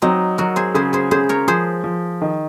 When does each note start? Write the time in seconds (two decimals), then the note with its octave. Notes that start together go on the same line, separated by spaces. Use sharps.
0.02 F#3 C4 D#4
0.38 F#3 F#4 A#4
0.56 G#4 C5
0.74 C#3 G#4 C5
0.93 G#4 C5
1.11 C#3 G#4 C5
1.29 A#4 C#5
1.47 F3 G#4 C5
1.84 F3
2.22 D#3